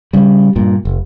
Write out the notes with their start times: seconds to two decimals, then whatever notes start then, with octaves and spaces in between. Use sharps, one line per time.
0.13 C#3 G3
0.56 G2 A#2
0.85 F1